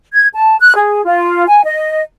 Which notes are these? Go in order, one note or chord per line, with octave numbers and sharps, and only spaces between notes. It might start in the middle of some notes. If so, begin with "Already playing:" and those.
G#6
A5
F#6
G#4
F4
G#5
D#5